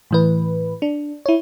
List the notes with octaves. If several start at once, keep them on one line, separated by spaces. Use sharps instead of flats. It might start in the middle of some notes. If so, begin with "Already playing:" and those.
A2 E3 B4
D4
E4 C#5